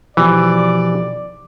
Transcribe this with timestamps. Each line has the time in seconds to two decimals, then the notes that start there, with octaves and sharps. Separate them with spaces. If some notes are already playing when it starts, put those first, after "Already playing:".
0.17 B2 E3 F3 G4 D5